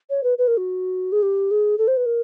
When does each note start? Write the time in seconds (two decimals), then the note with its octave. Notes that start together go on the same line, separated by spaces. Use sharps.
0.10 C#5
0.23 B4
0.38 B4
0.47 A#4
0.57 F#4
1.12 G#4
1.23 G4
1.51 G#4
1.78 A4
1.88 C5
1.97 B4
2.06 A#4